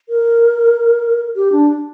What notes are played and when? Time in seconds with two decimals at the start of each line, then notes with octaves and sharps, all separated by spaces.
0.09 A#4
1.36 G4
1.52 D4